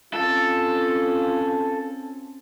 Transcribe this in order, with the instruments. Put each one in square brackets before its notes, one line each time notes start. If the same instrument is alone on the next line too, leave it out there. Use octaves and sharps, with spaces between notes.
[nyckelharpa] C4 C#4 [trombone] F4 [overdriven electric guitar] A4